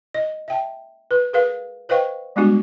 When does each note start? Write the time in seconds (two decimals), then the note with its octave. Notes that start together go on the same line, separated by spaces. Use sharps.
0.14 D#5
0.48 E5 G5 A5
1.11 B4
1.33 G#4 A#4 B4 F5
1.89 B4 C5 D#5 F5 G5 C#6
2.36 G3 G#3 B3 D4 F#4 G4